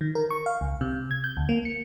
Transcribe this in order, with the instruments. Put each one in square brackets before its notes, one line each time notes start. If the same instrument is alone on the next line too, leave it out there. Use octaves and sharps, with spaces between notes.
[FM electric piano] D#3
A#4
C#6
F5
C#2
C3
G#6
G6
D2
A#3
C#7